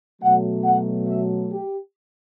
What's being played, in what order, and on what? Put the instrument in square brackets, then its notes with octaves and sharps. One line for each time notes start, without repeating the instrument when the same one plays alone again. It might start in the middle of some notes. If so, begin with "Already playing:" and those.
[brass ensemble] B2 F#3 A3 F#5
F#5
E5
G4